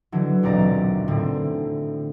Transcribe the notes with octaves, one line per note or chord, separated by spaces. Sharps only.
D3 E3 F#3
D#1 B1 C4 D5 A#5
A2 D3 C4